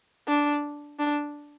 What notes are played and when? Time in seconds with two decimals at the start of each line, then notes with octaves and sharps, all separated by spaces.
0.28 D4
0.99 D4